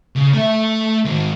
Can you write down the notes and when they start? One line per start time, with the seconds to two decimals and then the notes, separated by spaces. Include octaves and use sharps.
0.16 C#3
0.33 A3 E5
1.05 G#2 D#3